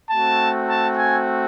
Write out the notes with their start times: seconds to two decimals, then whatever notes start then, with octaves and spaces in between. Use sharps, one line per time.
0.10 A3 C4 F#4 A5
0.68 A5
0.97 G#5